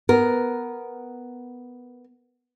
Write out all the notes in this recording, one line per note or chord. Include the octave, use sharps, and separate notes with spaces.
B3 A#4